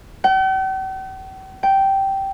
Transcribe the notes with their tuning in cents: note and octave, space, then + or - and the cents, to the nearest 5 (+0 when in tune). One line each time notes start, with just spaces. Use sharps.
G5 -45
G5 -10